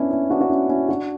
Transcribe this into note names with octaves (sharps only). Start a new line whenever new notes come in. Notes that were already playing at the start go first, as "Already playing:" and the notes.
Already playing: B3 C#4 D4 E4
C#4 E4
D4 F#4
F#4
C#4 E4
C#4 E4
D4 F#4